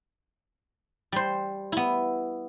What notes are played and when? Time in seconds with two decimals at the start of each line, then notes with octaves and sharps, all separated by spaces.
1.12 G3 C5
1.72 B3 E4